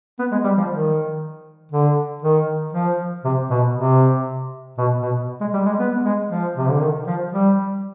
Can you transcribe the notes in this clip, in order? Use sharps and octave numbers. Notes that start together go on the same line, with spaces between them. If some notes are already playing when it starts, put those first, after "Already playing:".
B3
G#3
G3
F3
D#3
D3
D#3
F3
C3
B2
C3
B2
B2
G#3
G3
G#3
B3
G#3
F3
C3
D3
D#3
F3
G3